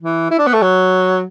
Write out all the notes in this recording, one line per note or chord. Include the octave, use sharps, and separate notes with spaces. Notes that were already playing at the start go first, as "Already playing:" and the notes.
E3
E4
D4
B3
A3
F#3